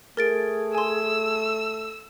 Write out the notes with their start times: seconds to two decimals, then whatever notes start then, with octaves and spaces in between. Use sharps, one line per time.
0.17 A3 G#4 A#4 A6 D7
0.75 G#5 C6 E6